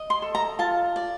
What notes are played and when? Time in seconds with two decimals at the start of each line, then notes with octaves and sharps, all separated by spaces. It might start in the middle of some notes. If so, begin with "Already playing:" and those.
Already playing: D#5
0.10 C6
0.22 A4
0.35 A#5
0.59 F4 A5
0.96 D5